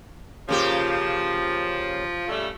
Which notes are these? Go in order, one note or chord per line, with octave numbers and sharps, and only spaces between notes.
C#3 F3 A#3 G4
C#3 G3 A3